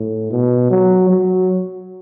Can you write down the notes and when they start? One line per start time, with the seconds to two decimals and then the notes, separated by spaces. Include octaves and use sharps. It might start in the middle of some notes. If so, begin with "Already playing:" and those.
Already playing: A2
0.31 B2
0.71 F#3
1.10 F#3